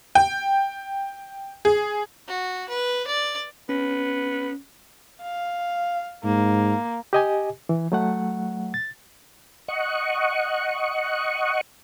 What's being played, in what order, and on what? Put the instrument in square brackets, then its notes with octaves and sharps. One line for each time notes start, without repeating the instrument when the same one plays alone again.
[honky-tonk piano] G5
G#4
[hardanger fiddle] F#4
B4
D5
[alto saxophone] B3 [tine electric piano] C#4
[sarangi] F5
[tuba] G#2 [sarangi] A#3
[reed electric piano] G4 D#5 G#5
E3
F#3 A3 F#5
A6
[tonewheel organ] D#5 F#5 C#6